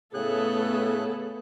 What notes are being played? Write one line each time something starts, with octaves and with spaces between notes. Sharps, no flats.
A2 C#3 A3 B3 G#4 A4 F#6